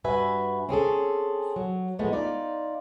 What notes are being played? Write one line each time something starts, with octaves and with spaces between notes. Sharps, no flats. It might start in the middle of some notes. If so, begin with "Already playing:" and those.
G2 F#4 B4 E5 G#5
C4 C#4 G#4 A4
F#3
A2 F3 G#3 A3 B3
D#4 F4 D5